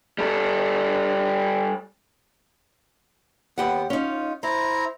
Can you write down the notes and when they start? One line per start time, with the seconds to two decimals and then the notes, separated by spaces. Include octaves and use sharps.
0.19 G3 A4
3.58 D#2 B3 G4 F#5
3.90 C#4 D#4 F4
4.43 E4 C5 A#5